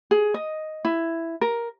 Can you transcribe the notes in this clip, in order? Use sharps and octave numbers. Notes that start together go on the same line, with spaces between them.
G#4
D#5
E4
A#4